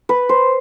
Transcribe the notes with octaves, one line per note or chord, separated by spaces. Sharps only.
B4
C5